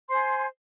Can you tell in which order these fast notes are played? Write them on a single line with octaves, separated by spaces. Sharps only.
C6 C5 G#5